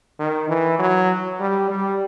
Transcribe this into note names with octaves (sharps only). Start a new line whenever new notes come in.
D#3
E3
F#3
G3
G3